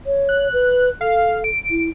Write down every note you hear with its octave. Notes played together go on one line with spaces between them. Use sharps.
C#5
F#6
B4
A4 F5
D7
E4